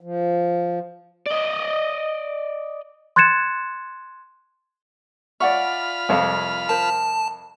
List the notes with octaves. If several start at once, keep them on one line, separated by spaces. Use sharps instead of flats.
F3
D5 D#5
C6 F#6 G#6 A6 C#7 E7
F4 D5 E5 F#5 G#5 B5 C#6 F6
C2 F2 F5
A#4 C5 A5